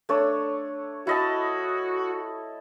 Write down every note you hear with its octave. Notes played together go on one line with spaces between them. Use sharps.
A3 D4 C#5
E4 F#4 D#5 A5